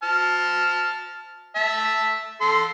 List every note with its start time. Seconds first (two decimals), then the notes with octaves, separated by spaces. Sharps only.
0.03 A5 F6
1.56 E5 A5
2.41 A4 C6